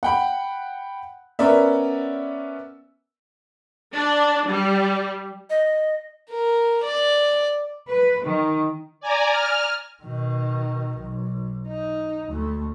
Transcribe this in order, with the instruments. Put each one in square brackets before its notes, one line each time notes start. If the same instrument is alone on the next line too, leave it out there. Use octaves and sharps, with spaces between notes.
[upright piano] F#5 G5 B5
B3 C#4 A#4 D5 E5
[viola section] D4
G3
[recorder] D#5
[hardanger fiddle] A#4
D5
[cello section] B4
D#3
[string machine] D5 G#5 A#5
F6
[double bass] B2 D#3
B1
D#4
D2 A3